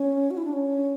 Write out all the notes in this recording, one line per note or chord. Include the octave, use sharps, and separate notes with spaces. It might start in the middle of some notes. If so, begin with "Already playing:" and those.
Already playing: C#4
F#4
E4
D4
C#4